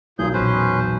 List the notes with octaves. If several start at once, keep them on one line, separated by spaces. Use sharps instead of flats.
B1 A#2 G#4 G6
A#1 E2 C#4 B4 C5